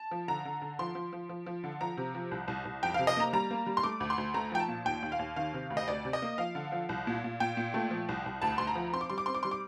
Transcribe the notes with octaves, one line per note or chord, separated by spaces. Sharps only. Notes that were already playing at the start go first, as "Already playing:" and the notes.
Already playing: A5
F3
D3 A#5
D3
D3
F3 C6
F3
F3
F3
F3
D3
F3 A#5
C3
F3
C2
C2
C2
F2 G5
C3 F5
D#5
A#3 A#5
G3 A#5
A#3
G3
C6
A3 D6
D2
C6
D2
A3 A#5
F3 G5
A5
A#2
D#2 G5
D#2
F5
D#2
D#3 F5
C3
D2
D#5
D2 D5
C3
D#5
A#3
F3 F5
D3
F3
C2
A#2
A#2
A#2 G5
A#2
A3
F3
C2
C2
D2 A5
D2 C6
A#5
F3
C4 C6
D6
G3 C6
D6
C4 C6
D6
G3 C6
D6